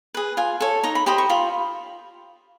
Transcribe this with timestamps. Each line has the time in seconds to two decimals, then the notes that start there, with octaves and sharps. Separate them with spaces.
0.14 G#4 B4
0.37 F4 G#5
0.60 A4 C#5
0.83 D#4 A#5
0.95 B5
1.06 G4 C5 D#5 B5
1.18 C#6
1.29 F4 B5